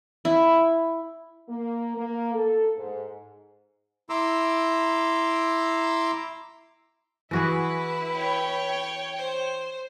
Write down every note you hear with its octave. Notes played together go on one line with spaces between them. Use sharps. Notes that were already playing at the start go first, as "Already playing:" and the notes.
E4
A#3
A#3
A4
G#2
E4 A#5 C6 D6 E6
E3 E4 F#4 G#4 B4
C#5 G5
C5